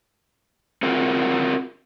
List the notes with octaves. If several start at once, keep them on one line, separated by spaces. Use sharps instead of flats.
C4 F4 F#4 G#4 A#4